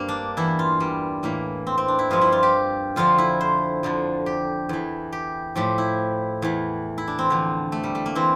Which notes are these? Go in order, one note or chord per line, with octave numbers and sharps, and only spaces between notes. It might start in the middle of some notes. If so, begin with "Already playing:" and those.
Already playing: G2 A#3 C4
D4
E2 E3 E4
F4
G3
A2 E3 A#3
C4
C4
D4
E4
G2 F3 F4
E4
F4
G4
F2 D3 F3 F4
E4
C5
F2 D3 F3
G4
E2 E3
G4
A2 F3 G4
E4
E2 E3
E4
D4
C4
E2 D3 F3
A3
G3
A3
A#3
E3 C4